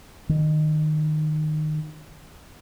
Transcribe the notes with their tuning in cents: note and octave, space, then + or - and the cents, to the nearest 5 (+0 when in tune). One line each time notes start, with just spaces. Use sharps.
D#3 -20